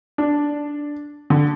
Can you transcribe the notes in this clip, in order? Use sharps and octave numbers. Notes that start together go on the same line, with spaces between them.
D4
D3